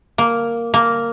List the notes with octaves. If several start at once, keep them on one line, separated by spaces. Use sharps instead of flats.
A#3
A#3